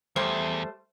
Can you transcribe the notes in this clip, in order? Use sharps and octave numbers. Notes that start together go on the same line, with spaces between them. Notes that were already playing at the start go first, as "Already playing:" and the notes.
E2 G3 A3 C5